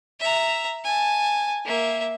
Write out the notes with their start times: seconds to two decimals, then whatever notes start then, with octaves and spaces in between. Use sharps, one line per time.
0.20 E5 A#5
0.84 G#5 A5
1.65 A#3 E5